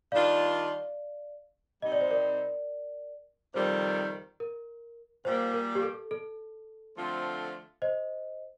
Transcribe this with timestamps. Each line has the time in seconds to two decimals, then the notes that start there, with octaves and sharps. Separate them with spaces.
0.12 D#3 G3 D4 F4 D5 F5
1.82 C3 G3 C4 D#4 G4 D#5
1.92 D5
2.01 C5
2.10 A#4 D5
3.54 F2 C3 D#3 G3 C5
4.40 A#4
5.25 A#2 G3 A#3 C5
5.54 A#4
5.75 G4
5.83 A4
6.11 A4
6.96 D3 F3 A3 C4 F4
7.82 C5 D#5